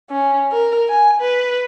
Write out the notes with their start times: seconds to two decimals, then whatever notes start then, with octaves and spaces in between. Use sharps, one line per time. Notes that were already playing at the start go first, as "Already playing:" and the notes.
0.10 C#4
0.52 A#4
0.88 G#5
1.21 B4